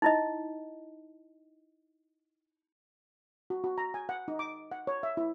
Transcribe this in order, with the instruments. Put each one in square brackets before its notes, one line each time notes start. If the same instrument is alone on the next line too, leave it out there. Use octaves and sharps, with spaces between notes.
[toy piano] D#4 E4 D#5
[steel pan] F#4
F#4
A#5
G#5
F#5
D#4
D6
F#5
C#5
E5
E4